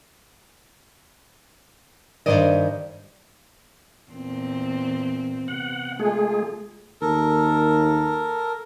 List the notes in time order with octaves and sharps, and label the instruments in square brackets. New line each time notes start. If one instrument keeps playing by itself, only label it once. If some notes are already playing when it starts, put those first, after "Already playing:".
[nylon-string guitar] G2 B2 D#3 C5 D5 D#5
[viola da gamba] E2 A#2 C4
[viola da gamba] C3 B3 [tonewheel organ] F#5
[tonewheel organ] G#3 A3 G#4 [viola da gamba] F4
[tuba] D#2 [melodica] A4 A#4